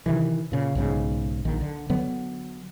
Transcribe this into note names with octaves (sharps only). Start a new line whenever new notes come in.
C3 D#3 E3
A#2 C#3
B1 G#2 C#3
A#1 D#3
D3
D3 F#3 B3